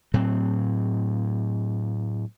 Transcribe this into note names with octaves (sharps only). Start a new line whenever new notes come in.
A2 F#3 C4